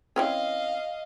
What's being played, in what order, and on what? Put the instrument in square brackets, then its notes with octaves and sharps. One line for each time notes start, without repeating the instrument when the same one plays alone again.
[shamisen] E3 C4 C#4 [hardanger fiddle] D#5 F5